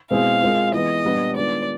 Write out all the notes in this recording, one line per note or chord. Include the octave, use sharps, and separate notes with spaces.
B2 G#3 C4 E4 G#4 F5
G#3 C4 F4 A#4
E3 G#3 B3 D#5
A#2 G3 B3 D4
D#3 G#3 B3 D4 F4 D5